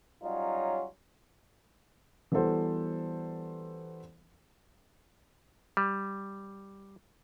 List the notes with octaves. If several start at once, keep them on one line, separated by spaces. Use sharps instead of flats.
F#3 G3 C#4 D#4 F4
E3 G3 B3 F#4 A4 C5
G3